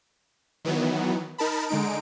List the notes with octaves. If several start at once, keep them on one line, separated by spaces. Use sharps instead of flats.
D#3 E3 F#3 B3
D#4 A#4 A5 B5
D3 G#3 D#4 D7